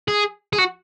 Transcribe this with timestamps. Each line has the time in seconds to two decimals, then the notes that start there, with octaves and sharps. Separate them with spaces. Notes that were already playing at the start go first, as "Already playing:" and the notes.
0.08 G#4
0.53 G#4
0.58 F#4